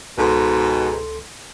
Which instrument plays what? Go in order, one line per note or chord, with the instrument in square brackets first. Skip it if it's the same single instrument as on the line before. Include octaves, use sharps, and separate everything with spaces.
[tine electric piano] C#2 A4 C6 [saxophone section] G#2 B2